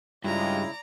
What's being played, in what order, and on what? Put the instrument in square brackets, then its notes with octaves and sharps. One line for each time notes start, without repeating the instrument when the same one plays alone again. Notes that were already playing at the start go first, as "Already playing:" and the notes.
[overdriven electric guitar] G2 [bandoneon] C#3 E4 [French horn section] G#3 F4 [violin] D5 A#5